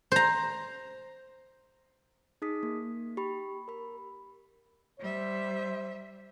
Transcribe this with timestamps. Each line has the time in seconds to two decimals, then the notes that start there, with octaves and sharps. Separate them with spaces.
0.12 C5 A#5
2.42 D#4 G#4 D#6 B6
2.63 A#3
3.17 G4 B5
3.68 A#4 B5
5.00 G3 C5 E5